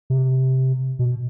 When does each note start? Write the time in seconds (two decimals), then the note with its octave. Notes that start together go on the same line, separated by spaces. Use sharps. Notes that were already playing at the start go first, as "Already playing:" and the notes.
0.10 C3
0.99 B2